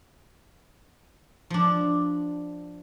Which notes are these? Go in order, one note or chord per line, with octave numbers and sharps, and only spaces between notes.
F3 D4